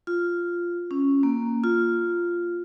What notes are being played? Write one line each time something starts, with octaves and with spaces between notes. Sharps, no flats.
F4
C#4
A#3
F4